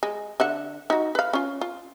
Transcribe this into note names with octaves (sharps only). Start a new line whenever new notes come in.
G#3
D3 E5 F#5
D#4 F#4
B4 F5
C#4 F4
F4